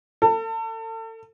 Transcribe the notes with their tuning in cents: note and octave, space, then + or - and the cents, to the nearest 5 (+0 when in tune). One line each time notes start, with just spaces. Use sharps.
A4 +35